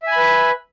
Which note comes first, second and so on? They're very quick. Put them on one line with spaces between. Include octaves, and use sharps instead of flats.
E5 G#5 B5 B4